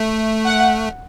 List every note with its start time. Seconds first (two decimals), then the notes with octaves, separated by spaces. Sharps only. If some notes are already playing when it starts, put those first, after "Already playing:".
Already playing: A3
0.46 F#5